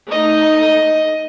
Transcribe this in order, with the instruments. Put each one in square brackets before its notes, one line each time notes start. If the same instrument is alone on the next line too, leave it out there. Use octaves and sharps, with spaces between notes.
[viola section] A3 D#4 [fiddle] D#5